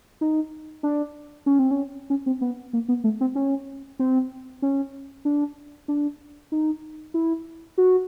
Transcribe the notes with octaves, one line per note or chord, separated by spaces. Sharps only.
D#4
D4
C#4
C4
C#4
C#4
C4
B3
A#3
B3
A3
C4
C#4
C4
C#4
D4
D4
D#4
E4
F#4